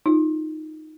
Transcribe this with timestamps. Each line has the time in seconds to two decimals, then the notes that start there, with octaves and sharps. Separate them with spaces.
0.06 D#4 F4